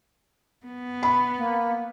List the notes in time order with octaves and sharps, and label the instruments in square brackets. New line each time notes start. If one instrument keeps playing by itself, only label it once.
[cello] B3
[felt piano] B5
[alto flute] A#3